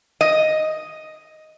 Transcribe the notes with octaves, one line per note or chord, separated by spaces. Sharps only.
D#5